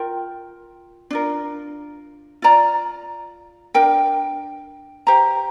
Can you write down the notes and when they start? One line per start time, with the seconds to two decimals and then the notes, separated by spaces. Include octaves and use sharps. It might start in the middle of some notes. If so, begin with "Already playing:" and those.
Already playing: F4 A#4 G5
1.10 D4 F4 A#4
2.42 F4 D5 A#5
3.74 D4 A#4 G5
5.07 G4 C5 A#5